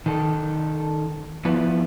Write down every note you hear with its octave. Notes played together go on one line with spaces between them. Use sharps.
D#3 A4
F3 B3 E4